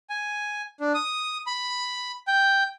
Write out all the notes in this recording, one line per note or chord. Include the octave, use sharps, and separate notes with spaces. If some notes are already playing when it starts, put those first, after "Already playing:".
G#5
D4
D#6
B5
G5